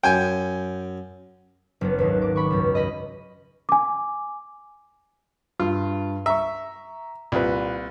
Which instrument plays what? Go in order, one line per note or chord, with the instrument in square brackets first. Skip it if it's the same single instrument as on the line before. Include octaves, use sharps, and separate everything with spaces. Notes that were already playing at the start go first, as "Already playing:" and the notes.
[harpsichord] F#2 [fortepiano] G5 G#5
[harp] F#1 B3
G#1 D#2
D6
B5 C#6
C#2 F#2
D#5 B5 D#7
[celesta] G#5 D6
[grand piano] G2 [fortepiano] F4
[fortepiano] E5 [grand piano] A#5 C#6
[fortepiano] C2 [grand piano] A#2 B4